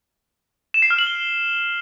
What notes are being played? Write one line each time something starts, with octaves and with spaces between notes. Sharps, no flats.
E7
C7
F6
F#7
G7